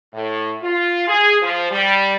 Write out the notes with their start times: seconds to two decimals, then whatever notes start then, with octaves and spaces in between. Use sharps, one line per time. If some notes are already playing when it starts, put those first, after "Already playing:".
0.14 A2
0.61 F4
1.07 G#4
1.41 F3
1.71 G3